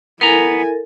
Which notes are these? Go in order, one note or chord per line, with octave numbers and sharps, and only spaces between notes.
B3 E4 A4 A#4 G#5 A#5